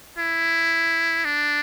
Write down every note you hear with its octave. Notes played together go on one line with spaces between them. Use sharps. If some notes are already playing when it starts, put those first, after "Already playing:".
E4
D4